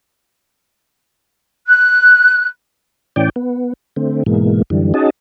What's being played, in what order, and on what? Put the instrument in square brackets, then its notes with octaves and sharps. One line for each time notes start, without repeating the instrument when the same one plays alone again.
[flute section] F#6
[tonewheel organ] A2 E3 C#4 D5 G5
B3
D3 A3 C4
G#2 B2 E3 G#3 A#3
F#2 D3 E3 G3
C#4 D#4 F#4 G#4 D#5 A5